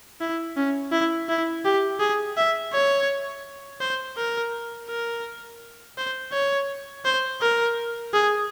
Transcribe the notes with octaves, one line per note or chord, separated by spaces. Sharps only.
E4
C#4
E4
E4
G4
G#4
E5
C#5
C5
A#4
A#4
C5
C#5
C5
A#4
G#4